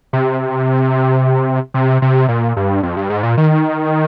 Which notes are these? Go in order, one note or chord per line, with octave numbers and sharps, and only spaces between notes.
C3
C3
C3
A#2
G2
F2
G2
G#2
A#2
D#3